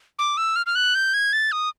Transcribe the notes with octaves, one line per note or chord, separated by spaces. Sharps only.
D6
E6
F6
F6
F#6
G6
G#6
A6
D#6